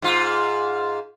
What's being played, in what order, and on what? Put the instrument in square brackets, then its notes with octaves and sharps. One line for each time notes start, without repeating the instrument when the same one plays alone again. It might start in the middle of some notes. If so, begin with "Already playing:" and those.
[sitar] G#2 F4